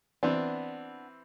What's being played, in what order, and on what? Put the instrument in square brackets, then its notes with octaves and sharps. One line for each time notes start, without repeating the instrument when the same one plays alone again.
[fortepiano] E3 C4 [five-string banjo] B3 D4